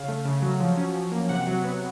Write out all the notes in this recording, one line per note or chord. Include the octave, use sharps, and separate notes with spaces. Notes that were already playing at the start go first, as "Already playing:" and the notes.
Already playing: C#3 F5
A3
C#3
F#3
F3
C#4
F3
A#3
C3 F#5
F#3
B3